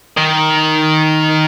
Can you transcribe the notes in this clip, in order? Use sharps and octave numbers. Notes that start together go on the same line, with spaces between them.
D#3